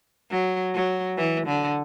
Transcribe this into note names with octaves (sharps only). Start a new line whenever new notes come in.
F#3
F#3
E3
D3